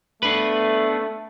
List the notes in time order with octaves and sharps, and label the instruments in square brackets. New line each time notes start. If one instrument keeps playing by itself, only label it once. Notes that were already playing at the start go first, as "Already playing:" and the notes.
[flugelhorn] A3 [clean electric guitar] B3 D4 B4